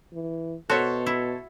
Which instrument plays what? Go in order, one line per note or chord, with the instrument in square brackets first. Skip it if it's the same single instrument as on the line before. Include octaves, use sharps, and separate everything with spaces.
[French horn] E3
[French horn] B2 [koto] F#4 E5 [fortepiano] A4 C5 C#5
[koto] E4